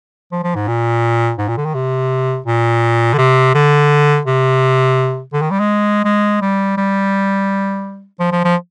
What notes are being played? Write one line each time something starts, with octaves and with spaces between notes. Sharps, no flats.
F3
F3
G#2
A#2
G#2
A#2
D3
D#3
C3
A#2
D3
C3
D3
C3
D3
D#3
G3
G#3
G#3
G3
G3
F3
F3
F3